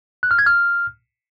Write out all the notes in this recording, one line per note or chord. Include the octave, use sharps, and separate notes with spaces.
F#6
F6
G#6
F6